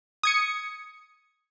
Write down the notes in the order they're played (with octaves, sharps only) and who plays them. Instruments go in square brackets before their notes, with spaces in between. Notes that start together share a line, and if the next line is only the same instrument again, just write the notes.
[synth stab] D#6 G#6 C#7